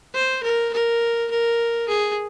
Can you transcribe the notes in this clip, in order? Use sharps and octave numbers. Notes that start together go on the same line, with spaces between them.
C5
A#4
A#4
A#4
G#4